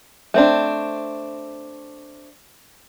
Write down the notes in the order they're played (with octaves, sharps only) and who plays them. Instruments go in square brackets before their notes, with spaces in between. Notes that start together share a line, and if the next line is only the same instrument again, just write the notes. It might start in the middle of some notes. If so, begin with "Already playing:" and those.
[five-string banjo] A3 C4 D4